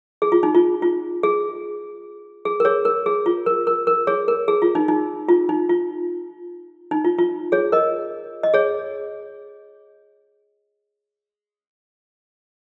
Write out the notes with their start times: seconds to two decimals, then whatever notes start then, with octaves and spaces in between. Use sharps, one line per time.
0.22 G#4
0.32 F4
0.43 D#4
0.55 F4
0.82 F4
1.23 G#4
2.45 G#4
2.60 A#4
2.65 G#4 C#5
2.85 A#4
3.06 G#4
3.26 F4
3.46 A#4
3.67 A#4
3.87 A#4
4.07 G#4 C#5
4.28 A#4
4.48 G#4
4.62 F4
4.75 D#4
4.88 D#4
5.29 F4
5.49 D#4
5.69 F4
6.91 D#4
7.05 F4
7.18 F4
7.52 G#4 C#5
7.72 A#4 D#5
8.43 D#5
8.54 G#4 C#5